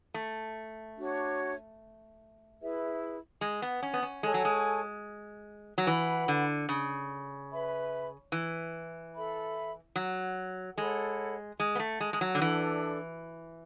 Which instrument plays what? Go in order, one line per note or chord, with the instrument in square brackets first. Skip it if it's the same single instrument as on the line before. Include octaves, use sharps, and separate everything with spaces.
[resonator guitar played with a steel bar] A3
[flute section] D4 F#4 C#5
E4 G#4 B4 E5
[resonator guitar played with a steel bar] G#3
B3
C#4
B3
C#4
[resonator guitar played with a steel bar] G#3 [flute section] A4 C#5 G#5 C#6
[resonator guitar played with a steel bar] F#3
G#3
F#3
[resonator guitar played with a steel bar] E3 [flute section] B4 F#5 B5
[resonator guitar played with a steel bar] D3
C#3
[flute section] B4 E5 B5
[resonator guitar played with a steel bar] E3
[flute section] A4 E5 B5
[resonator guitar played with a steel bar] F#3
[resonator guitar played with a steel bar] G#3 [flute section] A4 C#5 F#5 B5
[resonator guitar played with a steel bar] G#3
B3
A3
G#3
G#3
F#3
D3
[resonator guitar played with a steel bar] E3 [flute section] D4 A4 D5